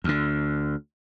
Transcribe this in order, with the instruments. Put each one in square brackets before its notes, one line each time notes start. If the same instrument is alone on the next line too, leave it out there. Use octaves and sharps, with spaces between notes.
[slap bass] D2 D3